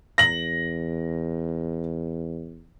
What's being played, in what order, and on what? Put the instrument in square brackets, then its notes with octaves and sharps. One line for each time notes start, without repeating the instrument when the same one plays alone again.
[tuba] E2 [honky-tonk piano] A#6 F#7